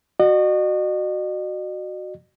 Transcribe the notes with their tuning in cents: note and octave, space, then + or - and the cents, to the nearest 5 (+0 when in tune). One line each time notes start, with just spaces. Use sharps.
F#4 +0 D#5 -45